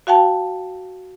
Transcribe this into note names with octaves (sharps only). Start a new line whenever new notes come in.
F#4 F5 G5 A5